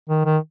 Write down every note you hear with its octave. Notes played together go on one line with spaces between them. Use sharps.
D#3
D#3